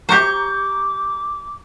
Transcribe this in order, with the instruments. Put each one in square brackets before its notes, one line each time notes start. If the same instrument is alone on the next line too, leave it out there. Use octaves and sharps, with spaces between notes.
[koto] G4 C5 [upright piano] A#5 C#6 G6 [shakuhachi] D6